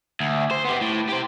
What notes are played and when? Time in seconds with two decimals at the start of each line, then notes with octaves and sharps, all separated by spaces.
0.21 D2
0.51 C5
0.64 B3 G4
0.81 A2
1.09 G4 C5